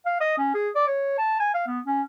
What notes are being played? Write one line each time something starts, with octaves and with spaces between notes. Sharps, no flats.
F5
D#5
C#4
G#4
D5
C#5
A5
G#5
F5
B3
C#4